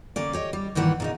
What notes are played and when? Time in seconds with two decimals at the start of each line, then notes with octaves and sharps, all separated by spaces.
0.16 D3 A#3 C#4 D5
0.33 G4 C#5 D#5
0.53 G3
0.75 G2 A#2 D#3 E3 G4 F#5
1.00 A#2 C#3 D#4